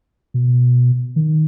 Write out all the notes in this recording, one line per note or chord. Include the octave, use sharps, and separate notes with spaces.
B2
D#3